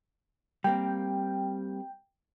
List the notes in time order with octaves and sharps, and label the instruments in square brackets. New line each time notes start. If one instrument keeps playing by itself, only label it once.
[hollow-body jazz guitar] G3 A#3 C4 [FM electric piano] G5